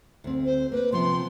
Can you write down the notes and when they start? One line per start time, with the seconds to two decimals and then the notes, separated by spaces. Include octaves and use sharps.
0.24 D2 C4
0.46 C5
0.72 A#3 B4
0.92 C3 F3 B3 C6